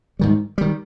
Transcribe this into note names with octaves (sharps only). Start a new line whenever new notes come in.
G#2 D#3 G3
D#3 G3